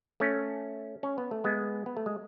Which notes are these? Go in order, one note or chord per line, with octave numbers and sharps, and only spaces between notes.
A3 C#4
C#4
B3
A3
G#3 B3
B3
A3
G#3